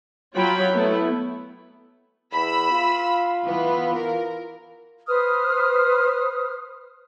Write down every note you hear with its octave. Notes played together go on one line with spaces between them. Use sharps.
F#3 F4 C#5 G5 B5
A3 B3 E4
E2 B5 E6
F4
E3 B3
A#4
B4 C5 D#6 F6